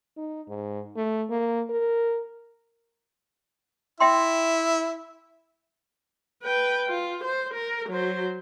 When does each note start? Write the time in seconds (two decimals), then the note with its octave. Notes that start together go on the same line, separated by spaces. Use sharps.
0.17 D#4
0.49 G#2
0.96 A3
1.30 A#3
1.70 A#4
4.00 E4 E5 G5 C6
6.43 B4 G5
6.88 F4
7.24 C5
7.54 A#4
7.90 F#3 C5